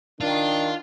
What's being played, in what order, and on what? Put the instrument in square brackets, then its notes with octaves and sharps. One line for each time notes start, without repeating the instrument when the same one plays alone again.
[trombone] D#3 [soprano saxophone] D4 [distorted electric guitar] F4